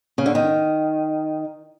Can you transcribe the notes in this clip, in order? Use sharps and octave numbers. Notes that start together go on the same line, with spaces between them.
C#3
D3
D#3